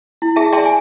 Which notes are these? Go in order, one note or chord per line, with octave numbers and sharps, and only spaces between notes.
E4
G#4 E5 A5
G#4 D5 E5 G5 A5 C6
G#5